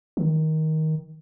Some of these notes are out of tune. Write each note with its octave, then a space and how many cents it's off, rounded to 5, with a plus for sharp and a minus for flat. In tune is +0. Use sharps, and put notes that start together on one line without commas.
D#3 +15